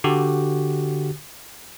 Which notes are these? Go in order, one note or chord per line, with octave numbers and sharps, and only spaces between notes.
D3 F#4 G4